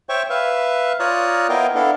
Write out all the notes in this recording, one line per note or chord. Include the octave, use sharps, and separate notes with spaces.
C5 C#5 E5 G5 C#6
B4 E5 F5
F4 C#5 D5 A#5 D#6 F#6
B3 E4 A#4 D#5 F5 G5
B3 D4 E4 A4 F5